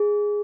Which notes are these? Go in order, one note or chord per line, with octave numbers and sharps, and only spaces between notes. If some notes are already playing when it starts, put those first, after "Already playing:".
Already playing: G#4